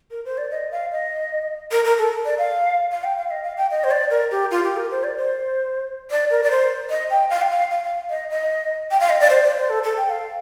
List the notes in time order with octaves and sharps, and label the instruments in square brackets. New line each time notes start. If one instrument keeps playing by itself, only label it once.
[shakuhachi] A#4
C5
D5
D#5
F5
D#5
A#4
A#4
A4
D5
F5
F5
G5
F5
D#5
F5
G5
D#5
C5
D5
A#4
G4
F4
G4
A#4
C5
D5
C5
D5
A#4
D5
C5
D#5
G5
F5
G5
F5
F5
F5
D#5
D#5
G5
F5
D#5
D5
C5
D5
C5
A4
A4
G5
F5